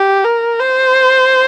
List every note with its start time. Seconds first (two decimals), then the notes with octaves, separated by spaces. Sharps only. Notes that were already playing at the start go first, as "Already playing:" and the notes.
Already playing: G4
0.24 A#4
0.59 C5